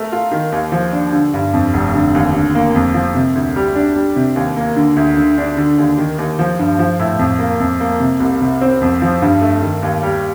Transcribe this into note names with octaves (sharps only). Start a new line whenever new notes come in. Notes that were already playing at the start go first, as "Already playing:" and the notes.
Already playing: A3 A#4
F4
D#3
D#2
F3
D4
D3
G2
F2
F1
D3
D#2
D3
A#3
F2
F3
C3
D2
G3
D4
G3
C3
D#2
A#3
D3
D2
D3
D4
D3
D#2
D#3
D#2
F3
G2
F3
A2
F2
A#3
F2
A#3
C3
C2
C3
C4
F2
F3
G2
A3
D#3
D#2
G3